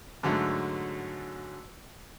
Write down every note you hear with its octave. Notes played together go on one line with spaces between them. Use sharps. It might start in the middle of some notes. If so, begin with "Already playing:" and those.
G#2 D3 F#3 A3